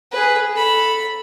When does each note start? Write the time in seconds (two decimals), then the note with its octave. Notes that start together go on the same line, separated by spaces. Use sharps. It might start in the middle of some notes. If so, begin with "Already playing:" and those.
0.12 G#4 B4
0.53 A4 B5